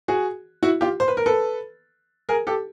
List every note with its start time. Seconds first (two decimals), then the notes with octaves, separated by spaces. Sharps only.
0.08 F#4 G#4
0.63 E4 F#4
0.81 F4 G4
1.00 C5
1.08 B4
1.17 A#4
1.26 A4 B4
2.29 G#4 A#4
2.47 G4 A4